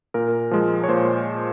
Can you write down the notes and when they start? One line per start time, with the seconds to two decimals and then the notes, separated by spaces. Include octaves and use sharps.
0.14 A#2 A#4
0.51 F3 G#3
0.84 C#5
0.88 A#2 C5